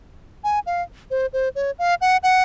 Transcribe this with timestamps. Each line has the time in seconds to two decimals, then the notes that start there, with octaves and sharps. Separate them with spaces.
0.44 G#5
0.66 F5
1.11 C5
1.33 C5
1.55 C#5
1.79 F5
2.01 F#5
2.23 F#5